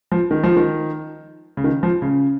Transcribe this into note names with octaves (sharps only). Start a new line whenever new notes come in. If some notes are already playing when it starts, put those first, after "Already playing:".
F3
D#3
F3
D#3
C#3
D#3
F3
C#3